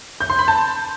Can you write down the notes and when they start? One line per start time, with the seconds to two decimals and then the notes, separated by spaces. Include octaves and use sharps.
0.21 G6
0.30 C6
0.39 B5
0.48 A5